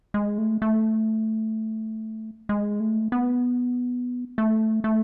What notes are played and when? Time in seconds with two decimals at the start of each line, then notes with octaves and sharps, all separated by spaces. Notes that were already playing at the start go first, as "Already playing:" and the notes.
0.14 G#3
0.38 A3
0.62 A3
2.49 G#3
2.80 A3
3.12 B3
4.38 A3
4.84 A3